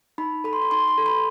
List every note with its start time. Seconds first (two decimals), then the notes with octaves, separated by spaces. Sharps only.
0.18 D#4 B5
0.44 A4 B5
0.53 C6
0.62 B5
0.71 D#4 C6
0.88 C6
0.98 A4
1.06 B5